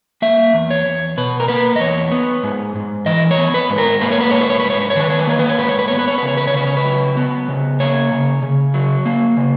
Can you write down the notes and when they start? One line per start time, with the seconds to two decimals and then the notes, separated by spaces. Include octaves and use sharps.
0.22 A#3 E5
0.54 E2
0.71 C#5
0.86 E2
1.17 B2 B4
1.40 A#4
1.48 A#3 B4
1.76 D#5
1.80 E2 C#5
2.12 B3
2.43 G#2
2.76 G#2
3.06 E3 D#5
3.31 C#5
3.38 B3
3.54 B4
3.70 G#2
3.78 A#4
4.01 A#3 B4
4.12 C#5
4.21 B4
4.31 G#2 C#5
4.41 B4
4.50 C#5
4.60 G#2 B4
4.70 C#5
4.81 B4
4.90 C#5
4.96 D#3 B4
5.10 C#5
5.19 B4
5.27 A#3 C#5
5.39 B4
5.49 C#5
5.58 G#2 B4
5.69 C#5
5.79 B4
5.88 B3 C#5
5.99 B4
6.08 C#5
6.18 B4
6.22 C#3
6.28 C#5
6.37 B4
6.47 C#5
6.53 C#3 B4
6.67 C#5
6.77 B4
6.85 F#3
7.17 B3
7.48 C#3
7.80 A#3 C#5
8.12 C#3
8.43 C#3
8.74 F#3
9.06 A#3
9.37 C#3